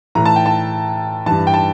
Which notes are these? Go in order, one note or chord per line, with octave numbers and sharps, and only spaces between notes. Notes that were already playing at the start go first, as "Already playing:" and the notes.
A2 E3 A#5
A5
G5
A5
G2 E3 A5
G5
A5